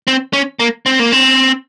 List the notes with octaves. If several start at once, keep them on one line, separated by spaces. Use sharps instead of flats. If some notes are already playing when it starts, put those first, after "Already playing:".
C4
C#4
A#3
C4
A#3
C4